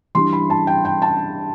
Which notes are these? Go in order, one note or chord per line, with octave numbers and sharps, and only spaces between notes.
E3 G3 D4 C6
B5
A5
G5
G5
A5